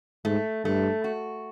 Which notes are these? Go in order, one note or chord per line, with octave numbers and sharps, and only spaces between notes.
G#2 A3
G2 A3
F#4